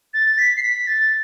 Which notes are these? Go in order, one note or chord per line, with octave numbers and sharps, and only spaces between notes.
A6
B6
C7
B6
A6